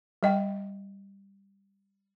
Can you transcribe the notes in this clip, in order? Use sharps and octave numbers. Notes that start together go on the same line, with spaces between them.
G3 D#5 G5